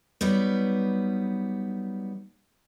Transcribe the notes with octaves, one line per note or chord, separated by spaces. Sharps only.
F#3 G3 B3 D#4